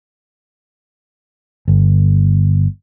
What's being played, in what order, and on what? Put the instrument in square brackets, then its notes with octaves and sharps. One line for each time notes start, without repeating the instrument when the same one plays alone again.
[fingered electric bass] G1